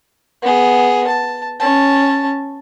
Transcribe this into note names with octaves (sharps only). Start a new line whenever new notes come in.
B3 G#4
A5
C#4 A5